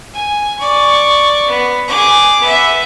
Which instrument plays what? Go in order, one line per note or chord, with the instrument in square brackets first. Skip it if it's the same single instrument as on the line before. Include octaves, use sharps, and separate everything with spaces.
[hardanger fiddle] G#5
D5 C#6
B3
G#4 D6
B3 E5